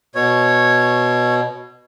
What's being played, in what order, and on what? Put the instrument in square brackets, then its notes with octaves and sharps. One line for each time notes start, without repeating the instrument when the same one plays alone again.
[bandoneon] B2 [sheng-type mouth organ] C#5